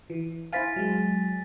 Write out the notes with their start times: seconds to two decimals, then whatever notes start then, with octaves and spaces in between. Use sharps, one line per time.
0.10 E3
0.53 E4 C5 F5 G#5 A6 B6
0.76 F#3 G#3